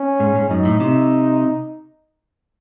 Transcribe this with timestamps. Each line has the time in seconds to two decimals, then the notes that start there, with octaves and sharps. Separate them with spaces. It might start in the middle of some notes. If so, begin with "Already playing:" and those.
Already playing: C#4
0.20 G#2
0.36 G#2
0.50 F#2 D#4
0.65 A2
0.80 C3